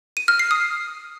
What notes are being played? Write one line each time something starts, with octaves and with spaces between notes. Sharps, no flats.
D#7
F6
C7
D#6